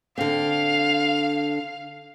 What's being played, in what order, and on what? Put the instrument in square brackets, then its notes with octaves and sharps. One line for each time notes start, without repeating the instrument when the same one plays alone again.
[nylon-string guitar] D3 C4 [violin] F5